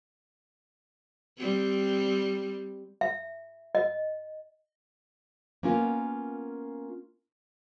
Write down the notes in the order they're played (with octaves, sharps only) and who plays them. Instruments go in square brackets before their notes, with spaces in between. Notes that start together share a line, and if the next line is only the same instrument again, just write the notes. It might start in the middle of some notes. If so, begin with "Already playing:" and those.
[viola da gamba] G3 C4
[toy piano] E5
D#5
[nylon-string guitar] A#3 B3 C#4 F4 A#4